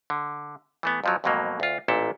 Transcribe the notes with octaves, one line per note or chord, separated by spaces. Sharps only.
D3
E3 A3 B3
F2 F3 F#3
F2 G#2 B2 F#3 A#3
D2 F4
A1 A#2 E4 A4